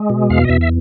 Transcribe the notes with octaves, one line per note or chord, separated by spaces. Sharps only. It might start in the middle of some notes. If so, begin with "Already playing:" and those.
Already playing: G#3
B2
E2 F5
D#5
E2 E5
E5